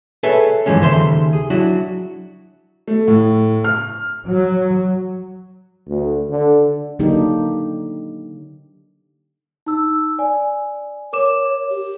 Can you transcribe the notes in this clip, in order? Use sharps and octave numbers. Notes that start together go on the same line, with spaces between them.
G#4 A4 B4 C#5 E5
G2 E3 F3 G#3 C#4
D#2 C#3 A4 C5 E5 C6
G#4
F#3 D4 E4 F#4
A3
A2
F6
F#3
D2
D3
D3 F#3 A#3 D4 D#4 G4
D#4 E6
D5 G#5
A#4 C#5 D6 E7
G4